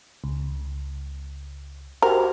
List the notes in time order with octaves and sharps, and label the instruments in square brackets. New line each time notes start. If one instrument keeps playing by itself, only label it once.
[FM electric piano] C#2
[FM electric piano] F#4 G4 C5 [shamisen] A#4